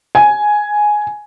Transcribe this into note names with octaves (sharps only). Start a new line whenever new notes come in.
G#5